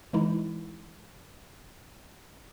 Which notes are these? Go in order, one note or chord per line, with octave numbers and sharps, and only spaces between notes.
E3 G#3 D#4 E4